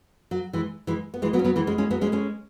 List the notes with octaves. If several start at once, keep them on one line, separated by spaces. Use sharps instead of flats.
F#3
E3 G#3
E3 G#3
B3
E3 G#3
F#3 B3
C#4
F#3 B3
E3 G#3
G#3 C#4
G#3 C#4
F#3 B3
G#3 C#4
G#3 C#4